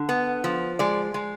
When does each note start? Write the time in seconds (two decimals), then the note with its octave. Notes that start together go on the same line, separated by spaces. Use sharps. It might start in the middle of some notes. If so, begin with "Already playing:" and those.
Already playing: D3
0.09 B3
0.44 F3
0.79 G#3 D5
1.14 G#3